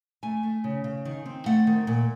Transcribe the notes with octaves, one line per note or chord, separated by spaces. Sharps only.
A3 G#5
A3
C#3
C#3
D#3
C4
A3 F#5
D#3
A#2